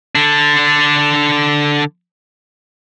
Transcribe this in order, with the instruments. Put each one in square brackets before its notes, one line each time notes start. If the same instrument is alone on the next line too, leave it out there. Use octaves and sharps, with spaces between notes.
[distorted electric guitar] D3 D4